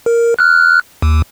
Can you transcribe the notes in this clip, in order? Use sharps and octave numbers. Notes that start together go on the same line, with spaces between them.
A#4
F6 F#6
D#2